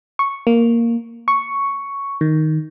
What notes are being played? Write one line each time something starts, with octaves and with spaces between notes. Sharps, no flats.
C#6
A#3
C#6
D#3